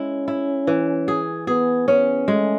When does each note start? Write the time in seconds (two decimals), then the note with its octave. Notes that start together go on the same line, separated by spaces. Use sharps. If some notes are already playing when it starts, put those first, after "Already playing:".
Already playing: G#3 C#4 E4
0.28 E4
0.67 E3
1.08 G#4
1.47 B3 G#4
1.88 B3 C#4
2.28 G#3 A3